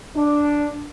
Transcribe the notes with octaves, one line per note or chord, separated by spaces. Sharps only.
D4